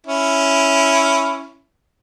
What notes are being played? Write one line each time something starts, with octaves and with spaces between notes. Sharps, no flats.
C#4 E4